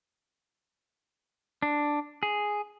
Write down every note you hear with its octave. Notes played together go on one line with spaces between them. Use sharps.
D4
G#4